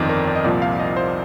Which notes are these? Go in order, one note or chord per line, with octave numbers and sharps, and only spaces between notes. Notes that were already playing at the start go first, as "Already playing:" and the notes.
Already playing: G1 F2 D#3 D5 D#5
A#4
D5
D#5
C2 A#2 F3 C4 D5
F5
D#5
C5